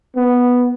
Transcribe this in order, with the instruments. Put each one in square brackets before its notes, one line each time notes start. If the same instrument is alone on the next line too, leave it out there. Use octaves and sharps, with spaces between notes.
[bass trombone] B3